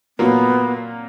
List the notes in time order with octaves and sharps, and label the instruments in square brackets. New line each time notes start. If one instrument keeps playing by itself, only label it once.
[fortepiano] A#2 F#3 A#3 [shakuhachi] B3